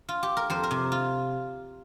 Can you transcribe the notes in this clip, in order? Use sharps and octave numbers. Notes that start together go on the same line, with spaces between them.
F4
G4
A#4
F2 C5
A#4
C3
F4